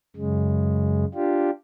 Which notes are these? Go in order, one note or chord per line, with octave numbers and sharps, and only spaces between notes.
F#2 C#3 G#3
D4 F4 G4